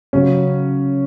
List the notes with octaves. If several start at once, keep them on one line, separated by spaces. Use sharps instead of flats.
C#3 F#3 C#4